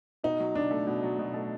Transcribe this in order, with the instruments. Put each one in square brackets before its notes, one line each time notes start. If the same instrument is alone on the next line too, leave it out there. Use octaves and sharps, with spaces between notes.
[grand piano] B2 [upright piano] D#4
[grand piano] F#3
[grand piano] B2 [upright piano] D4
[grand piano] A3
B2
F#3
B2
A3